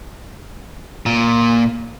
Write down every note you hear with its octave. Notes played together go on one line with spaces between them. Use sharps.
A#2